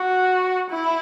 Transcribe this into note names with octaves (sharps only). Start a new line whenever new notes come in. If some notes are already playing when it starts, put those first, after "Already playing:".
Already playing: F#4
E4